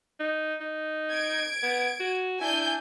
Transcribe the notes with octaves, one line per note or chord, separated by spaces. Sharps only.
D#4
D#4
G#6 D7
B3
F#4
D4 E4 G#5 G6